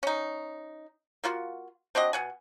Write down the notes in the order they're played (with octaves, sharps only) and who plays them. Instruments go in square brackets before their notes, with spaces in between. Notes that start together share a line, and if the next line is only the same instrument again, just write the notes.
[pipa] C#4 D#4
A#3 F4 F#4
C4 D4 F#4 D#5
B2 F#5 G#5